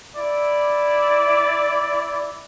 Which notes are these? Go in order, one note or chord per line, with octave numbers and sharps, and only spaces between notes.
E4 D5